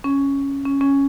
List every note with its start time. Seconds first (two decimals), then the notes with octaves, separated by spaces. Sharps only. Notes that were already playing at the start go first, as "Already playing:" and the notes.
0.04 C#4
0.65 C#4
0.81 C#4